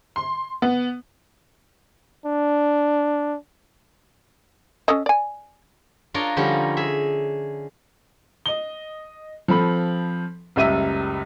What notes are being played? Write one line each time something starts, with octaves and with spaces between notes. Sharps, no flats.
C6
B3
D4
C#4 A4 D#5
D5 G#5
D4 F4 A#4 C#5 D#5
D3 F3 G3 C#4 D#4
G#4 E5
D#5 G7
F3 C4 A4 B5
F#1 C#2 G3 E5 D#7